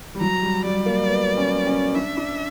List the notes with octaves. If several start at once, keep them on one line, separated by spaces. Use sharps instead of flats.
G3
F#3 A#5
G3
G3 D5
A#3
B3
C#4
C#4
D4 E5
D4